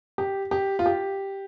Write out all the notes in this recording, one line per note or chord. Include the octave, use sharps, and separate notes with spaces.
G4
G4
F4
G4